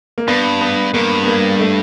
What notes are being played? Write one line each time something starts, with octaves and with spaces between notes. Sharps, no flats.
A#3
G2 B3
B3
G2 A#3
B3
A#3
A3